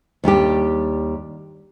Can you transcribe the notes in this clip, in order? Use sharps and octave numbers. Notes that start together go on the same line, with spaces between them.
D#2 G3 D4 G4